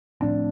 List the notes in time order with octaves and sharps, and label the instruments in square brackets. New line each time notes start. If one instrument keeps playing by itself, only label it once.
[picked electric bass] A2 F3 A3 C4 [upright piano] D4